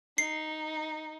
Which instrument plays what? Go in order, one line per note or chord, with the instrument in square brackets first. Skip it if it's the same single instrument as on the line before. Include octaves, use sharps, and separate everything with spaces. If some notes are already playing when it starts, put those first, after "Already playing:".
[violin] D#4 [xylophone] C7